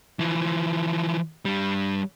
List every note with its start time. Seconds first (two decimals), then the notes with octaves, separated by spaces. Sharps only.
0.19 E3 F3
1.45 G2 G3